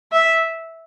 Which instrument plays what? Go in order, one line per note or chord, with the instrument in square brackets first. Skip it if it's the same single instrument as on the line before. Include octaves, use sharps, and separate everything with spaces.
[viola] E5